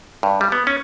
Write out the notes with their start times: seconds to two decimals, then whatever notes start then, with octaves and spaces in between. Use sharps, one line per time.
0.23 G2
0.41 G3
0.52 B3
0.67 C#4